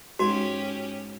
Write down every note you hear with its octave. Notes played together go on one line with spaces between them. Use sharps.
G#2 C#4 F#4 G4 G#5